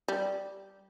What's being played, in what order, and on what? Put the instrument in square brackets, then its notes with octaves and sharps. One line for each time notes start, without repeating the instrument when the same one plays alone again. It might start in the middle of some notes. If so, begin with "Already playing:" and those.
[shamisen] G3